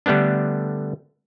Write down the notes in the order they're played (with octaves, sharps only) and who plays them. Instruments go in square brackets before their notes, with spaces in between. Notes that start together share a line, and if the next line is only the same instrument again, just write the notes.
[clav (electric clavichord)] D3 G3 A3 B3 D4